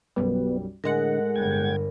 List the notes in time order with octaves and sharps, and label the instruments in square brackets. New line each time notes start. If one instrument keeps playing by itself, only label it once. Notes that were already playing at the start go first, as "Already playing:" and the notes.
[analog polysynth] B1 F#2 G3 [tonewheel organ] B3
[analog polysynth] A2 G#3 F#5 [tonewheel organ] D3 [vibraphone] A#4
[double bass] G1 [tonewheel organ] G5 G#6